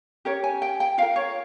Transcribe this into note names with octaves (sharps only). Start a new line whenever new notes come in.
C#4 G4 A#4 C#5
G#5
G5
G5
F4 A#4 F5
C#5